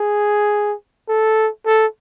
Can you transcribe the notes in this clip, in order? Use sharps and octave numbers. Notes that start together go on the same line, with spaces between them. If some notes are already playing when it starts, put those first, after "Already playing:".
Already playing: G#4
A4
A4